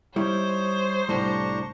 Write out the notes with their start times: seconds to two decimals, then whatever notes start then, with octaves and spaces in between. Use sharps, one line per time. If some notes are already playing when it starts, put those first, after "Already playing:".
0.16 G3 D#4 E4 C5 C#5
1.09 C2 A2 G3 D4 A#5 C#6